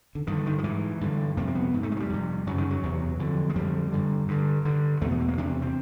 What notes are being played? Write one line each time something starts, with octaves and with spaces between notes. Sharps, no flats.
D3
G2 D3 D#3
D#3
F3
G#2 E3
G2 D3
F2 C3 A#3
A#3
B3
G#2
A3
G#3
F#3
G3
F2 C3
F#2 C#3 F#3
D#3
F#3
E2 C3
F2 D3
G#3
F2 D3 G3
G2 D3
G2 D3
G2 D3
E2 B2 A3
G#3
A3
A#3
E2 C3 D4
C4